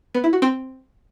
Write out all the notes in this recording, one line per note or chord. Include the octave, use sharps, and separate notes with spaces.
B3
E4
F#4
C4